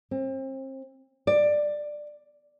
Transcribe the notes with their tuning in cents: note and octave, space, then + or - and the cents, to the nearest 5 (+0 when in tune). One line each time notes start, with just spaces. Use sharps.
C4 +35
D5 +15